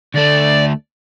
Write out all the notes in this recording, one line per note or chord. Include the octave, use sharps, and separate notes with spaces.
D2 A3 D5